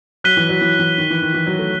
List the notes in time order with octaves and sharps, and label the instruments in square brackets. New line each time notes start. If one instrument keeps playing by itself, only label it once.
[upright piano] F#3 [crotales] F#6 B6 D#7 G7
[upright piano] E3
F#3
E3
E3
D#3
E3
D#3
E3
F#3
A3